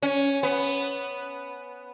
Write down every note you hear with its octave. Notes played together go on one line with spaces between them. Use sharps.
C#4
B3